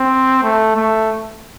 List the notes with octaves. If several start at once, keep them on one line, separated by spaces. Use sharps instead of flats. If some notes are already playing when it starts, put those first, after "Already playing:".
Already playing: C4
A3
A3